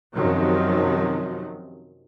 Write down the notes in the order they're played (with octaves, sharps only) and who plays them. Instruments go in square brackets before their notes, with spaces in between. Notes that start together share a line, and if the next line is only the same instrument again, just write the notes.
[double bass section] F#2 C3 D#3 F3 F#3